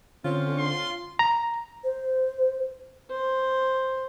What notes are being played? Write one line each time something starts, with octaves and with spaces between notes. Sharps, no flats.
D3 C4 C#4 F4
C6
A#5
C5
C5